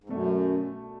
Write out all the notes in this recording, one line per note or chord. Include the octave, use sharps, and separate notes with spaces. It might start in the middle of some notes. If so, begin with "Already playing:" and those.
G#2
F#2 B2 A3 D4